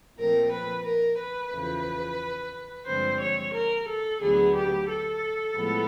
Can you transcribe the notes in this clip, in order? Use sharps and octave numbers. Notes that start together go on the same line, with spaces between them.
A#2 F3 A3 C4 A#4
B4
A#4
B4
E2 C#3 F3 A3
G2 D3 F3 G#3 C4 C5
C#5
A#4
A4
D2 D3 F#3 B3 G#4
G4
A4
A2 F3 G#3 B3